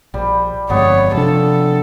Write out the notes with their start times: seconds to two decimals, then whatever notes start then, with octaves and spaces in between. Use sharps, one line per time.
0.14 A#1 G3
0.70 G1 F2 G#3 B3 C#5
1.15 C3 F3 D4 A4